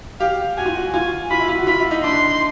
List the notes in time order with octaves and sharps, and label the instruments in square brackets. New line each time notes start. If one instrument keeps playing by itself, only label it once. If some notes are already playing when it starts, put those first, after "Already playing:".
[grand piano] G4 [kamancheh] F5
[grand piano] F#4 [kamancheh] G#5
[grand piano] F4
F#4
[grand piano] F4 [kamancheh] G#5
[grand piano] F4 [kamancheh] B5
[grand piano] E4
F4
F#4
[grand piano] F4 [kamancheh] B5
[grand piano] E4
D#4
[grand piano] D4 [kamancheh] C6